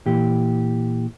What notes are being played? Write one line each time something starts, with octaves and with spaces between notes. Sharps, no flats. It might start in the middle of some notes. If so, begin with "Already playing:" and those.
A#2 E3 G4